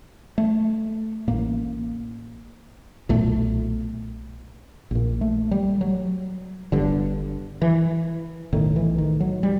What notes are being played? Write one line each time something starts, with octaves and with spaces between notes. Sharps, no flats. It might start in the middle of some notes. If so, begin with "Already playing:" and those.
A3
A1 A2 A#3
B1 A#2 A3
A#1 A#2
A3
G3
F#3
G1 G2 D3
E3
B1 A2 D#3
E3
D#3
F#3
G3